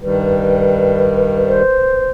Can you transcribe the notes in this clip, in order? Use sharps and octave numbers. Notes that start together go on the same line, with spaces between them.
G2 D#3 G3 B4
C5